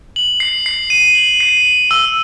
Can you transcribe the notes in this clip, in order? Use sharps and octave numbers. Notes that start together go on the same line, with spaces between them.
F#7
C7
C7
D#7
F#7
C7
F#7
E6